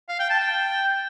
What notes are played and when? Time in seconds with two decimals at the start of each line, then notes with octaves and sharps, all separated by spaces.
0.09 F5
0.19 G5
0.30 A5
0.40 G5